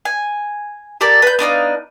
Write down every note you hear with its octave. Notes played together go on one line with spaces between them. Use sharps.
G#5
G4 A4 A#4 D5
B4 G6
B3 D4 D#4 F5